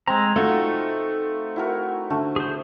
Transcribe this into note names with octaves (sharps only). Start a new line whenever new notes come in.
G#3 C4 A#5
A3 D#4 F4 F#4 A4
E4 F#4 A#4
D3 A3
G#4 C5